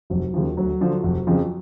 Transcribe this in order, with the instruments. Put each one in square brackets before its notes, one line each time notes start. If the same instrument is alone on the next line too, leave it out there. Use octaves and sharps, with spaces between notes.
[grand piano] F1 F#3
D#2 C#3 F3
D2 F#3
D3 F3
F1
F2 C#3 F3